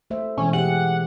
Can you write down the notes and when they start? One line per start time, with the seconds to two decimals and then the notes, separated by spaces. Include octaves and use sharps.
0.10 A3 C5 E5
0.37 B2 E3 G#3 C#4
0.53 B3 G4 G#4 F#5